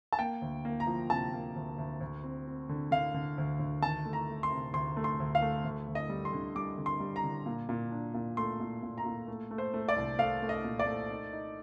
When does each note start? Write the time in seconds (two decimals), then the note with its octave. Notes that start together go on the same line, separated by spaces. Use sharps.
0.13 A5
0.19 A#3 G5
0.42 D2
0.65 A#3
0.80 A#5
0.87 F3
1.10 C3 A5
1.33 A#3
1.56 D2
1.78 D2
2.01 D2
2.24 C4
2.47 C4
2.69 D3
2.91 D3 F5
3.14 D3
3.38 D2
3.59 D2
3.82 D#3 A5
4.05 A3
4.13 A#5
4.29 A3
4.43 C6
4.51 C3
4.73 D2 C6
4.97 A3
5.04 C6
5.20 D2
5.35 F5
5.42 A3
5.64 D2
5.88 D2
5.95 D#5
6.09 G3
6.25 C6
6.33 D3
6.55 G3 D6
6.78 D3
6.86 C6
7.00 G3
7.16 A#5
7.24 D3
7.46 A#2
7.69 A#2
7.91 D4
8.14 A#2
8.37 A3 C6
8.60 A#2
8.83 A#2
8.98 A#5
9.05 A#2
9.28 A3
9.51 A3
9.58 C5
9.74 A3
9.88 D5
9.96 C2
10.19 A3 F5
10.42 A3
10.49 D#5
10.64 A#2
10.79 D5
10.87 A3
11.10 D#4
11.33 D#4